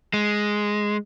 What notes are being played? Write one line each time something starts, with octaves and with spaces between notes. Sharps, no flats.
G#3